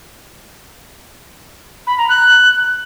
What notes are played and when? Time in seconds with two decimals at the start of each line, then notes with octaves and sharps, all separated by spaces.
1.87 B5
1.98 A#5
2.09 F#6